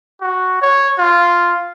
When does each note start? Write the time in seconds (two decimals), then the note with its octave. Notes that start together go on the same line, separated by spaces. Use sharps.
0.21 F#4
0.62 C#5
0.98 F4